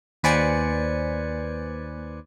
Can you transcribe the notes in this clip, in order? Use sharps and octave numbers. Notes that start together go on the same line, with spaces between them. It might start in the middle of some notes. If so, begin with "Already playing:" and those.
D#2 B4 C5 D5 G#5 C#7